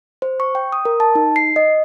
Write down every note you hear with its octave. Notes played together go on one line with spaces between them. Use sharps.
C5
C#6
G5
D#6
A#4
A5
D#4
C7
D#5